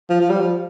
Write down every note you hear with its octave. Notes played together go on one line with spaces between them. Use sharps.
F3
F3
G3
F3